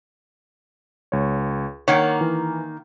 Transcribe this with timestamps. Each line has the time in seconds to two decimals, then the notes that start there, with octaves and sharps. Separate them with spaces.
1.12 C#2 C#5
1.88 D#3 A#3 C#5 F#5
2.21 E3